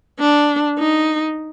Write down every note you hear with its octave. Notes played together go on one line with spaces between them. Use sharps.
D4
D#4